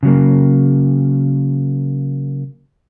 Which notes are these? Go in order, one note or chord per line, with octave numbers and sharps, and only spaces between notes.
C#3 F#3 A#3